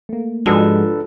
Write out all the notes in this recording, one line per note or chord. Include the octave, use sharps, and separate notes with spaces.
A3 A#3
G#2 F3 G#3 D4 F4 F#4 A4 B4